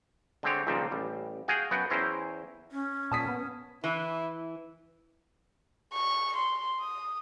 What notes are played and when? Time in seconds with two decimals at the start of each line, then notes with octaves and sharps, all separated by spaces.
0.43 D3 G#3 C4 G4 C#5
0.67 C#2 A#2 D#3 F3 G3 C4
0.91 A1 G3
1.48 F#4 G#4 F5 G5 G#5
1.71 F#2 B3 F#4 F#5 G5
1.90 E2 C#4 E4 C5 G5 A#5
2.72 C#4
3.12 A#2 A5 D#6 B6
3.28 B3
3.84 E3 E4
5.94 C#6
6.36 C6
6.81 D#6